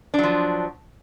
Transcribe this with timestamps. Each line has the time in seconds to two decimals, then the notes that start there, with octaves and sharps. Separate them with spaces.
0.14 D4
0.19 F#3
0.23 F3